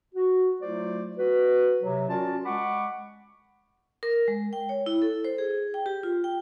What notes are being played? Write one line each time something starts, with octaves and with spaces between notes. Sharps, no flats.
F#4
F#3 A3 E4 F4 C5 D5
F#4 B4
C3 F#3
C#4 F4 F#4 A#4 D5 A5
G#3 F#5 B5 C#6 D6
A#4
G#3
G5
C#5
E4
A4
C5
G#4
G5
G4
F4
G5